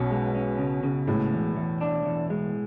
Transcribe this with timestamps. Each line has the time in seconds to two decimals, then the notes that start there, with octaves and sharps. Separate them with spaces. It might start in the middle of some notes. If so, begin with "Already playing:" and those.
Already playing: B1 B2 C#4
0.10 G#3
0.35 C#4
0.59 C#3
0.84 C#3
1.07 A2 G#3
1.32 E2
1.57 E2
1.81 D4
2.06 E2
2.30 G#3